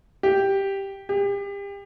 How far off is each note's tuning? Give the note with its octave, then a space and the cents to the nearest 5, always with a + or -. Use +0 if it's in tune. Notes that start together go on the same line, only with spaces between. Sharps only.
G4 +0
G4 +35